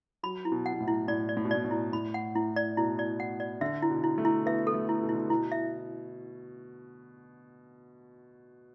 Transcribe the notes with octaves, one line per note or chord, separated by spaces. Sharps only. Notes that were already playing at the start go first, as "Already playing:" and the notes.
F#3 B5
E4
B2
F#5
B2
A2
E4
A2 D5
D5
A2
B2
A2 D5
A2
E4
A2 B5
F#5
A2 E4
D5
B2 E4
D5
F#5
D5
D3 E5
E4
B2
E4
A3
E4
B3 E5
A4
A3
E4
B2
E4
D3
B2 E4
E5